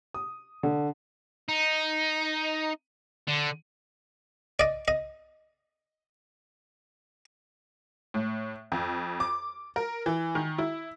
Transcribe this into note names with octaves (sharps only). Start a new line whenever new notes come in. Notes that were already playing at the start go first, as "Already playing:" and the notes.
D#6
D3
D#4
D3
D5 D#5
D#5
A2
F2
D6
A#4
E3
D#3
E4